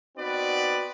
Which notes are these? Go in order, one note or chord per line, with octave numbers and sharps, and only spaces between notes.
B3 C4 D#4 F#4 B4 D5